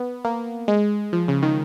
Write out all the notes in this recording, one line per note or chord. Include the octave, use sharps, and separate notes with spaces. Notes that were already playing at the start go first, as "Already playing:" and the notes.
Already playing: B3
A#3
G#3
F3
C#3
D#3